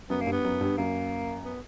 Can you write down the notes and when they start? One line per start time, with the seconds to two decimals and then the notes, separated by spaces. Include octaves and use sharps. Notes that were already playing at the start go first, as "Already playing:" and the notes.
0.10 F#2 B3
0.21 A#3
0.26 G2
0.32 B3
0.44 F#2
0.61 G2
0.77 F#2 A#3
1.45 B3